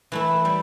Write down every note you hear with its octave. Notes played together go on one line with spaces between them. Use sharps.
E3 A3 E4
G3